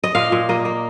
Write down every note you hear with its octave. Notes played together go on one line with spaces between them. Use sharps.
D#5
A#2 F5
A#2
A#3 D#5
A#3